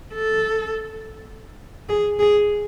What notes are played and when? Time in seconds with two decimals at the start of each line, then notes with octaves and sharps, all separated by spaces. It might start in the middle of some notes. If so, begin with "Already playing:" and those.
0.14 A4
1.89 G#4
2.19 G#4